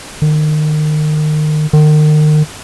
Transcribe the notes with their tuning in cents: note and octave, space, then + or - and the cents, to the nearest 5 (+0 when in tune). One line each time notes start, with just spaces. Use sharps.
D#3 -30
D#3 -35